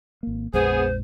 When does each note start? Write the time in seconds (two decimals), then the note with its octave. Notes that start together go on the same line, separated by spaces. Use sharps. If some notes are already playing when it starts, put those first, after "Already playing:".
0.23 G#1 A#3
0.54 A#1 F2 G#3 B3 G#4 C5